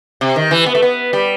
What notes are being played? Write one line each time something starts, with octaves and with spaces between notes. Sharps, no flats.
C3
D#3
E3
B3
A3
B3
G3